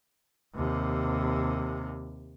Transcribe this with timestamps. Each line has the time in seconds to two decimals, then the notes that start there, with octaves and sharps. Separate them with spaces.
0.55 D#2 C3